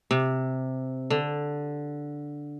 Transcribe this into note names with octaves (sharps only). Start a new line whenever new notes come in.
C3
D3